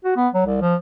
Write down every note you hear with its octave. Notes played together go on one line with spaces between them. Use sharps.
F#4
B3
F#3
C2
F3